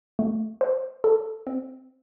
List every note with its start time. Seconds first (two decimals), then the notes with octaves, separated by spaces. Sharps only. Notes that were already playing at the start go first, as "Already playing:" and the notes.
0.19 A3
0.61 C5
1.04 A4
1.47 C4